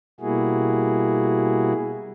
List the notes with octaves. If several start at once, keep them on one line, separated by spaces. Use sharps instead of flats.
B2 G3 A#3 E4 F#4 G#4